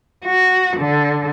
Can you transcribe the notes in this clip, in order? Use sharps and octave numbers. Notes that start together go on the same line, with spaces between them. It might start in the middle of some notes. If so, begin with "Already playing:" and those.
F#4
D3